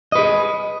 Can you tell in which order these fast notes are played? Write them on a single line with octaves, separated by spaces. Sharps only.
D#5 B4 G#4